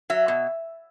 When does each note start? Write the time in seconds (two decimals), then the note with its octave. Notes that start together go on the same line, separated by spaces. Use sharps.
0.10 F#3 E5
0.28 B2